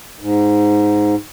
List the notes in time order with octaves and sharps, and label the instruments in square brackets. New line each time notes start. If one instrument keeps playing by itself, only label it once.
[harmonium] G#2